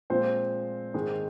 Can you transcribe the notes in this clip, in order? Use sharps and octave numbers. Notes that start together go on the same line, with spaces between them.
A#2 F3 G#3 C4 C5
G#2 D#3 G#3